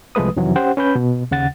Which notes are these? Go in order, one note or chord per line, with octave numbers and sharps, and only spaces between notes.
C2 F3 G#3 A3 B4 D#6
F2 C3 D#3 E3 F#3
C#4 G4 C5 F#5 G5
C#4 B4 B5 G6
B2
D#2 C#3 F#5 A6